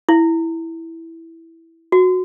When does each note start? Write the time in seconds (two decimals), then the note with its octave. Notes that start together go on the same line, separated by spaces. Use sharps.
0.09 E4
1.92 F#4